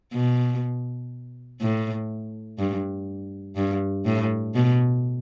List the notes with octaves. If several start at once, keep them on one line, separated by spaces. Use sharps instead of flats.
B2
A2
G2
G2
A2
B2